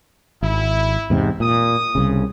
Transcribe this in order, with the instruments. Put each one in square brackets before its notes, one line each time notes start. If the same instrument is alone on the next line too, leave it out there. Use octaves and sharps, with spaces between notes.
[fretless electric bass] G#1 [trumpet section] E4
[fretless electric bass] E2 G#2 C3
[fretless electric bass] A#2 [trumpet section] D#6
[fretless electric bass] C2 C#3